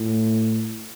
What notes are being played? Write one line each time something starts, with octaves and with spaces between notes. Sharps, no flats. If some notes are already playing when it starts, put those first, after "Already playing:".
Already playing: A2